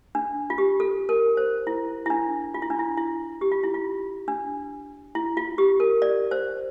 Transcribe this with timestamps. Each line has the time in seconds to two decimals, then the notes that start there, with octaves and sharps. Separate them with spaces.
0.15 D4
0.50 F4
0.58 G4
0.80 A4
1.09 A#4
1.37 C5
1.67 E4
2.06 E4
2.10 D4
2.54 F4
2.62 E4
2.70 D4
2.79 E4
2.97 E4
3.41 G4
3.52 F4
3.63 E4
3.74 F4
4.28 D4
5.15 E4
5.37 F4
5.58 G4
5.80 A#4
6.02 D5
6.31 C5